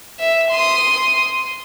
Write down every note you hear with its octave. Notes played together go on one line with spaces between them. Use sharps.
E5
C6 D#6